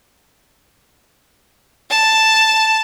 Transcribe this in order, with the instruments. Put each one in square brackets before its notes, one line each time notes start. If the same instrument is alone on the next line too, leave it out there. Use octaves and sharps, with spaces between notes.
[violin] A5